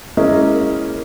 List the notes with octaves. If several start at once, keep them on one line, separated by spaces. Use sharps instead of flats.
G#3 A#3 C#4 E4 D#5